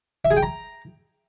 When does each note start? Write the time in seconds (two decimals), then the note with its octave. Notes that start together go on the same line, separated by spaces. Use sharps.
0.25 E5
0.31 G#4
0.37 G5
0.43 A#5